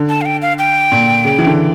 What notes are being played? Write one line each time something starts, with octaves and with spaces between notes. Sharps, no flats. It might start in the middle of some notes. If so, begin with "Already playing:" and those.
Already playing: D3
A5
F5
G5
F5
G5
A#2
C#3
E3
D3